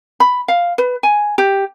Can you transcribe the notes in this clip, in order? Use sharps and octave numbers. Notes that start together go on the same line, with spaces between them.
B5
F5
B4
G#5
G4